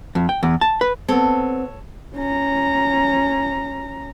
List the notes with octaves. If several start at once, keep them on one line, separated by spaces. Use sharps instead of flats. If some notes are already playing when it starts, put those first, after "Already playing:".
F2
G5
E2
A5
B4
B3 C4 A4 C#5
C#4 A#5